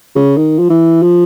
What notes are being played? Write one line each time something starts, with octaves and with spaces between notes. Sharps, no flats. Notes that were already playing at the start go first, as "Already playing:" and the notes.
C#3
D#3
F3
E3
F3